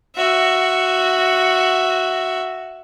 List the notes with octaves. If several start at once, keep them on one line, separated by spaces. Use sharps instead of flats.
F#4 E5